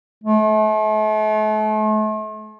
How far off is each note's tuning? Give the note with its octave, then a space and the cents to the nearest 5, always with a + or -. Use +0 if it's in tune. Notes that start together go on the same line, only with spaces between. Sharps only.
A3 -40